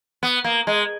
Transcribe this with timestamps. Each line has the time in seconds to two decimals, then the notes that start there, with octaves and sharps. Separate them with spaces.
0.23 B3
0.44 A#3
0.67 G#3